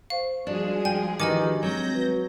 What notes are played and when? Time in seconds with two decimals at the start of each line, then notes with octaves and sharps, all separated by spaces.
0.10 C5 F5 C#6
0.47 F3 G3 G#3 D4 F#4 G#4
0.85 G5 G#5
1.20 D#3 E3 D4 F#4 G4 D#5 G#5 D6
1.63 F#3 G#3 C4 G6 A#6
1.94 F#4 B4